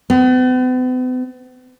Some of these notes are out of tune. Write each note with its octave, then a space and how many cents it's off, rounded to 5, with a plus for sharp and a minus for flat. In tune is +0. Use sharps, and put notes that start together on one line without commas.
B3 +45